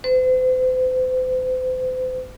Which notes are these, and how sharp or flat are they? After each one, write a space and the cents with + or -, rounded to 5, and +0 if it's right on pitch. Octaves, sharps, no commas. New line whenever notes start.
C5 -40